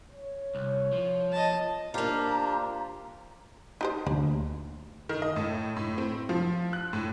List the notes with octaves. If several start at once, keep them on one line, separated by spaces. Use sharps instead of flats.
C#5
C2
F3
D#5 A5
A#3 D4 F4 G4 C5 A#5
D#4 G4 C5
D2 A#3
D#3
D#5
A2
A2
C4
F3
F#6
A2